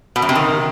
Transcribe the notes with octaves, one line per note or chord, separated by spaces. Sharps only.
B2
F#2
C3
D#3